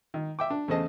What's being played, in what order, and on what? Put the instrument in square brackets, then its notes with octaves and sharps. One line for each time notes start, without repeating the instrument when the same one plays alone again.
[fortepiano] D#3
E5 G5 D6
D4
E2 C#3 A3 C5 D#5 A5